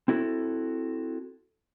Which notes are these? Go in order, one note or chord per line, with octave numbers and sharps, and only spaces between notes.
C4 E4 F#4 A4